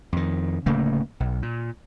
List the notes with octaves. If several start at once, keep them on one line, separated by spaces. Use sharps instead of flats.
F2 D#3
D1 C#3 A3 A#3
B1
A#2